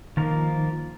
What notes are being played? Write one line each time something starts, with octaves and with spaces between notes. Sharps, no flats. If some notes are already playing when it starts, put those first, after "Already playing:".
D#3 F3 A#3 F4 A#4